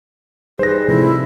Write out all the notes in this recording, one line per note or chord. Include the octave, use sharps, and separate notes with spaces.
G3 D#4 G#4 B4 C5 A#6
C3 F3 A3 E4